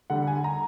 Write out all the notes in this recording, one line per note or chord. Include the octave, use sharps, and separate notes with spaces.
D3 G3 F#5
G#5
A#5